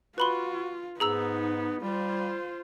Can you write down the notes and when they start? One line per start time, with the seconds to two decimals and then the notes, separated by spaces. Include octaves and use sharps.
0.18 F4 F#4 B4 B5 C6
1.00 G#2 B3 D#4 G#4 A#5 E6
1.83 G3 F4 C5